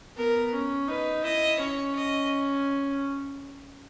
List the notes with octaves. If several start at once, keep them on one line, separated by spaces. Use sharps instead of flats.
B3 A#4
C#4
D#4 B4
E4 D#5
C#4 C#5
D#5